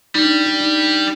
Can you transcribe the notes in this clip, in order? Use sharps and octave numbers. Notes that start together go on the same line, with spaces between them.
G3 D#4
D4
D4
D#4